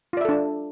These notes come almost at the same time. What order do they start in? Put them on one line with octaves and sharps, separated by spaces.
F4 D5 E5 A4 D4